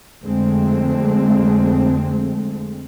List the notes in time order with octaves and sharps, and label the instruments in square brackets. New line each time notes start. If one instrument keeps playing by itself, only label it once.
[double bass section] F2 D3 G#3 A3 C4